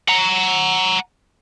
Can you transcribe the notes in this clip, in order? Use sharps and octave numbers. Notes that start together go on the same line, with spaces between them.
F#5 A#5